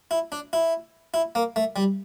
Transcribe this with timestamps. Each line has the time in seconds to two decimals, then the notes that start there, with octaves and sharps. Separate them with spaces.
0.11 E4
0.32 D4
0.53 E4
1.14 E4
1.35 A#3
1.56 A3
1.76 G3